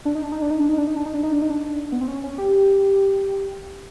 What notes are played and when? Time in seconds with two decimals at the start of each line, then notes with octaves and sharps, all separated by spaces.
0.05 D4
0.15 D#4
0.23 D4
0.32 D#4
0.42 D4
0.51 D#4
0.60 D4
0.69 D#4
0.78 D4
0.87 D#4
0.96 D4
1.06 D#4
1.14 D4
1.23 D#4
1.33 D4
1.42 D#4
1.50 D4
1.92 B3
2.01 C4
2.08 C#4
2.24 C#4
2.38 G4